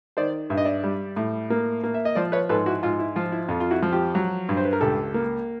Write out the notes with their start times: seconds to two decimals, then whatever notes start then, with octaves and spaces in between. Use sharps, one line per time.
0.17 D#3 C5 D5
0.50 G2 E5
0.58 D#5
0.65 D5 E5
0.84 G3
1.16 A2
1.50 A#3
1.83 A#3
1.94 E5
2.05 D#5
2.15 F3 C5 D5
2.32 B4 C#5
2.49 G#2 A4 B4
2.66 E4 F#4
2.83 G#2 F4
2.99 E4
3.16 F3 F4
3.32 E4
3.49 F2 F4
3.60 F4
3.71 E4 F#4
3.82 F3
3.92 F4 G4
4.15 F#3
4.49 G2
4.57 C5
4.65 B4
4.73 A#4
4.81 C#2 G4 A4
5.14 A#3